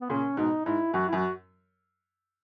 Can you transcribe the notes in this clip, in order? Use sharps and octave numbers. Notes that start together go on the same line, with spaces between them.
B3
A#2 C#3 C#4
G#2 B2 D#4
G#2 E4
F#2 F#4
E4
F#2 F#4